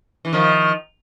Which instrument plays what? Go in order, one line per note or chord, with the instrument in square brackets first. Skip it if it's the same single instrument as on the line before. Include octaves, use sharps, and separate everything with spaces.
[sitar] E3
D#3 F3